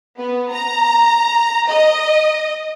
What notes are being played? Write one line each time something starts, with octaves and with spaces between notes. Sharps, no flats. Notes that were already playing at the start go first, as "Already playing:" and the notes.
B3
A#5
D#5